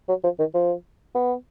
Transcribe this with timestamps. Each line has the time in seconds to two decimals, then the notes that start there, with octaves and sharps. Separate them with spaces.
0.09 F#3
0.24 F3
0.39 D#3
0.54 F3
1.15 B3